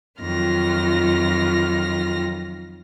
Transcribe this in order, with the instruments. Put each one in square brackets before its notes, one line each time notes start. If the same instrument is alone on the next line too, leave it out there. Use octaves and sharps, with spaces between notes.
[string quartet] F2 D#3 F#3 F4 F6 A#6